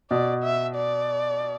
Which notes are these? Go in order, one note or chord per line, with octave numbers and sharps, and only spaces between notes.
B2 D5
E5
D5